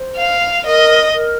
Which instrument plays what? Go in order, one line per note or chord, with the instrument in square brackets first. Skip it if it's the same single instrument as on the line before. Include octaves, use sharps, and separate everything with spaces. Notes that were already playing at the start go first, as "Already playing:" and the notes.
Already playing: [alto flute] C5
[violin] F5
[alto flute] A#4 [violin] D#5
[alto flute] A#4